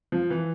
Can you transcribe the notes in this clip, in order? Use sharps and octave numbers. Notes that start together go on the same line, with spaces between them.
F3
E3